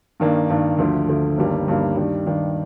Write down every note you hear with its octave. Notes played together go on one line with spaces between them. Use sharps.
G2 D#3 A#3 D4
G2 D#3 A#3 D4
D2 D3 F3 A3
D2 D3 F3 A3
G1 G2 D#3 G3 A#3
G1 G2 D#3 G3 A#3
G2 D#3 G3 D4
G2 D#3 G3 D4